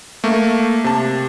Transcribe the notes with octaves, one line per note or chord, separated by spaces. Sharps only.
A3 A#3
C3 A5